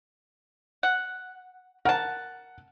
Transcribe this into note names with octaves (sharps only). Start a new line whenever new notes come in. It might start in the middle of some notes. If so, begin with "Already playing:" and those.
F#5
A#4 F#5 A5